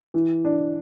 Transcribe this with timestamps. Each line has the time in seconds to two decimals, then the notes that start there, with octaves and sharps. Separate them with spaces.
0.14 E3
0.45 D4